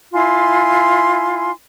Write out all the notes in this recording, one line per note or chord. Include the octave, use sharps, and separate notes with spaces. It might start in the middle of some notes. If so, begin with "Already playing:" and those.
E4 F4 G#5 C6